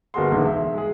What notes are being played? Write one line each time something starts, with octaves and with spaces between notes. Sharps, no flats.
G1 A#3 F#4 G#4 C6
E1 D2 G#2 G#3
E5
G#3 G#4